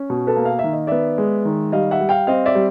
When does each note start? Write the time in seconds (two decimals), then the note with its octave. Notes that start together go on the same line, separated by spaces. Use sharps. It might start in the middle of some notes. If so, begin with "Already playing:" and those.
Already playing: C#4
0.10 B2
0.27 A4 B4
0.36 A#3
0.45 F5
0.59 D#3 E5
0.73 D#5
0.87 B3 D5 E5
1.18 G#3
1.45 D#3
1.72 G3 D#5 F5
1.91 E5 F#5
2.01 G3
2.09 F5 G5
2.27 C4 D#5 F5
2.46 D5 E5
2.55 G3